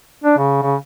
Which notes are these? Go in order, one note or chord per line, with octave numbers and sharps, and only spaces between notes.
D4
C#3
C#3